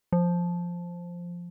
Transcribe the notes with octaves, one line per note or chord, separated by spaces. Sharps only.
F3